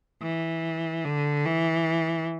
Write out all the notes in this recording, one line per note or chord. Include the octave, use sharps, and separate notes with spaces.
E3
D3
E3